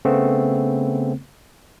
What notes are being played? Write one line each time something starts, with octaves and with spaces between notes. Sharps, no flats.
C#3 A3 B3 C4